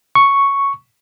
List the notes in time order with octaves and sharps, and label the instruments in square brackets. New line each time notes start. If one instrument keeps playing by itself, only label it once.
[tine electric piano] C#6